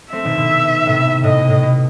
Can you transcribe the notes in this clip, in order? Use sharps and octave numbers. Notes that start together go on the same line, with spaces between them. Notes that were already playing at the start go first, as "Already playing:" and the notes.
A3 C4 E5
B2 D#3
B2
A2 C3
A2 D#5
B2
A2
B2